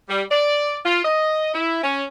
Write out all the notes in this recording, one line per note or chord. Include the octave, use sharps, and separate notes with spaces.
G3
D5
F4
D#5
E4
C#4